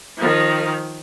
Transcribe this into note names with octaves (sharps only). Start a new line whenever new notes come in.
D#3 F3